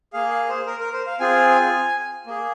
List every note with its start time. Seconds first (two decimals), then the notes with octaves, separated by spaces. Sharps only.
0.13 A#3 G#4 F5
0.31 F5
0.49 C5
0.66 A#4
0.80 A#4
0.93 C5
1.07 F5
1.20 C4 F4 G#4 G#5
2.27 A#3 G#4